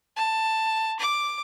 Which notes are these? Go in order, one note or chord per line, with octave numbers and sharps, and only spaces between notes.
A5
D6